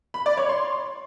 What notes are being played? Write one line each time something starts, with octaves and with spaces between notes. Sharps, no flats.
B5
D5
C#5
C6